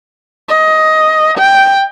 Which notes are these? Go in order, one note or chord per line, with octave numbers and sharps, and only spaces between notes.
D#5
G5